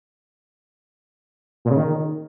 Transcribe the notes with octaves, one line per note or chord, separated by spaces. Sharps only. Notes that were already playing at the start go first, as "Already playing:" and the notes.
A#2
C#3
D#3